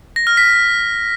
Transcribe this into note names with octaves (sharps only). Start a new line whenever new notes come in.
A#6
F6
B6